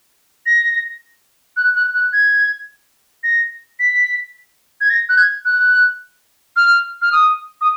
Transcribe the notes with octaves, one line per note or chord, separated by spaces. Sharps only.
A#6
F#6
F#6
F#6
G#6
A#6
B6
G#6
A#6
F#6
G#6
F#6
F6
F6
D#6
D#6